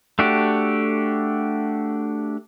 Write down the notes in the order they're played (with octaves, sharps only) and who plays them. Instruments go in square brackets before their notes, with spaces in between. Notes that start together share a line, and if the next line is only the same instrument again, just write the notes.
[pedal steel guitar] A3 D4 F#4 G4